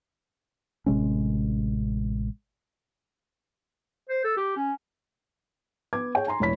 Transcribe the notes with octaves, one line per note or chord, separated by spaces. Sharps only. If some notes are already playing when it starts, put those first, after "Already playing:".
A1 C3 G#3 C#4
C5
A4
G4
C#4
B3 D6 G#6
G#4 C#5 G5
G#5 A#5 C6
E1 A2 E3 C#5 B5 B6